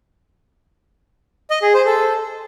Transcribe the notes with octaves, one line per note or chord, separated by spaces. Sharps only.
D#5
G#4
C5
A4